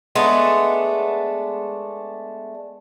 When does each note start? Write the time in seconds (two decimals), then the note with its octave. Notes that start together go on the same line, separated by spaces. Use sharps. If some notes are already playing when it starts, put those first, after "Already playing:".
0.15 G#3 A3 B3 D4